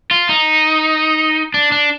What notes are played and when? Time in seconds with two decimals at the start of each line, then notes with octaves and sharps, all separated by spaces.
0.11 F4
0.29 D#4
1.54 D4
1.72 D4